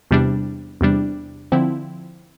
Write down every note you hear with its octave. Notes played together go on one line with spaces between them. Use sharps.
E2 C3 G3 D4
E2 C3 G3 D4
D3 F3 C4 E4